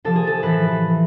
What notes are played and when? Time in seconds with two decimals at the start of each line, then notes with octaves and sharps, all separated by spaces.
0.04 C3 F3 A4
0.16 G#4
0.27 A4
0.43 A2 E3 B4